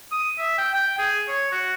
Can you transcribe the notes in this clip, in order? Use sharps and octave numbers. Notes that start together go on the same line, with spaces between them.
D#6
E5
G5
G5
G#4
C#5
F#4